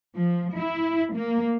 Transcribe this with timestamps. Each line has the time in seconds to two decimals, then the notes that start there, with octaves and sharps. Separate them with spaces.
0.14 F3
0.56 E4
1.14 A#3